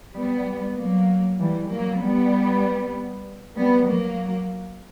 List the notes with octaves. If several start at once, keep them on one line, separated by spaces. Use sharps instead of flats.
G3 B3
F#3 A#3
E3 G3
F#3 A#3
G3 B3
G3 B3
F#3 A#3